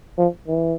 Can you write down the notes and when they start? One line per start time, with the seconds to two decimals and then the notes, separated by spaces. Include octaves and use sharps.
0.18 F3
0.48 E3